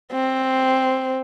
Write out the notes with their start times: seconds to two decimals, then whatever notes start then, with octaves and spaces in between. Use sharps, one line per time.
0.12 C4